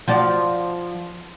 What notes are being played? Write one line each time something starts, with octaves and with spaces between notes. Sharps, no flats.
F3 F#4 D5